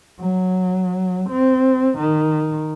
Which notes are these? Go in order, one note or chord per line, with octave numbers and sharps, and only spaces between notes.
F#3
C4
D#3